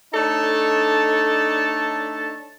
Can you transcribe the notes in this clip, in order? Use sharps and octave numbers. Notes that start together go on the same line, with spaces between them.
A3 D4 D#4 A4 C#5 A5